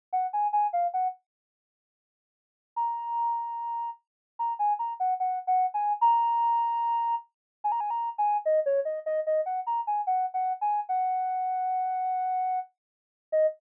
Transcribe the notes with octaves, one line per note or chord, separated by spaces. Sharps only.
F#5
G#5
G#5
F5
F#5
A#5
A#5
G#5
A#5
F#5
F#5
F#5
G#5
A#5
G#5
A#5
G#5
A#5
G#5
D#5
C#5
D#5
D#5
D#5
F#5
A#5
G#5
F#5
F#5
G#5
F#5
D#5